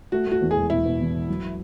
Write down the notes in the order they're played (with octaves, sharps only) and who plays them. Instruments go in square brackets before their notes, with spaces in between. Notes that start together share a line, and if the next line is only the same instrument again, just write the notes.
[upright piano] A3 [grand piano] F#4
[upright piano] A3
[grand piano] F#4
[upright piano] E2
[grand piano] G#4
[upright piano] E1
[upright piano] B2 [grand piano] E4
[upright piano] B2
E2
E1
F#3